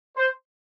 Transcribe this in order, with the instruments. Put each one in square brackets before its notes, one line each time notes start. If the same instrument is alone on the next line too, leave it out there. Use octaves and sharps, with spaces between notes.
[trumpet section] C5